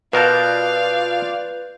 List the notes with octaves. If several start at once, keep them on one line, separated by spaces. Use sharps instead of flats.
B2 F4 A#4 B4 D5 F5 A5 G6